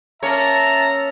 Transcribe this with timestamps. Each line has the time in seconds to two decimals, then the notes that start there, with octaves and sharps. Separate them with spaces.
0.23 A#3 C#4 C#5 E5 A5 A#5